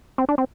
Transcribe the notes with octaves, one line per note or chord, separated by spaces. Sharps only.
C4
D4
C4